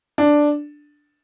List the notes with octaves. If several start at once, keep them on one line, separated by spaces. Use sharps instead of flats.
D4